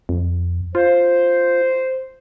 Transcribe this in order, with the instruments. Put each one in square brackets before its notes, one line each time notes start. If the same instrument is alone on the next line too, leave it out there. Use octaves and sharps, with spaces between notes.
[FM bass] F2
[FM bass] F4 [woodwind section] C5